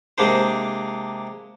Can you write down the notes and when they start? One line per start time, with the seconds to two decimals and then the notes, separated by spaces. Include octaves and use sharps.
0.18 C3 G#3 A#3 D4 C5